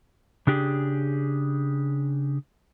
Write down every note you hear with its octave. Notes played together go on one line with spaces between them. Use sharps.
C#3 D4 G4 G#4